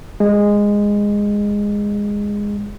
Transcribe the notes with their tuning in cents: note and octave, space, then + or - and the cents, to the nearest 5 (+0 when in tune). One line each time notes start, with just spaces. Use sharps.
G#3 -15